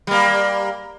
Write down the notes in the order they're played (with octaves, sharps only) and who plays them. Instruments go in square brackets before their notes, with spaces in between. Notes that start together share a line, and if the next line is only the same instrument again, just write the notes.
[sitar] G3 A#3